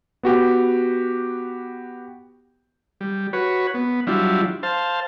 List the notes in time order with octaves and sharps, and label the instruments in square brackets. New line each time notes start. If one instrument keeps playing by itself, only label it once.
[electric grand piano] B3 F#4 G4
[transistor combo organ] G3
F#4 B4 C#5
B3
F#3 G3 D4 E4 F4
C5 F5 A5